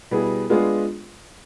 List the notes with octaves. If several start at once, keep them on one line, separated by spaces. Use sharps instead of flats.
B2 G3 B3 E4 G#4
G#3 B3 D4 F4 G#4